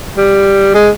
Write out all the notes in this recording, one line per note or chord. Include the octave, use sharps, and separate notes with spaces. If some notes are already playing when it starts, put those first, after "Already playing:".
G3
G#3